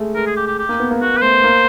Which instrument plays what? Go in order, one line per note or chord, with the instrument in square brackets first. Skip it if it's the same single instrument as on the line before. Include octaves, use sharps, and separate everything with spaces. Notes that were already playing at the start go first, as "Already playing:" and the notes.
Already playing: [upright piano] G#3 A3
[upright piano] G#3 [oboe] A#4
[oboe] G#4
G4
G4
G4
[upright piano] A#3
B3
A#3
[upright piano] A#3 [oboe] F#4
[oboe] B4
[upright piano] A3 [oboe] C5
[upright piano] A#3